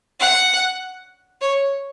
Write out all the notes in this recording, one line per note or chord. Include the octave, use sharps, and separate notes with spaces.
F#5
C#5